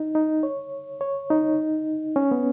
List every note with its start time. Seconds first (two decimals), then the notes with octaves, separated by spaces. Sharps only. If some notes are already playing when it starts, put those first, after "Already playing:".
Already playing: D#4
0.15 D#4
0.43 C#5
1.01 C#5
1.30 D#4
2.16 C#4
2.31 B3